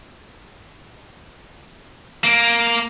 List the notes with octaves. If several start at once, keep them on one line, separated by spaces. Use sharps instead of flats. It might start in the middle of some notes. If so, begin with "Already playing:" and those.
A#3